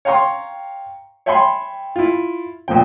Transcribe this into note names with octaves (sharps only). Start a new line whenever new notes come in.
C#5 F5 G5 A#5 C6 C#6
C#5 E5 G5 G#5 B5 C6
E4 F4
D2 A#2 F3 G5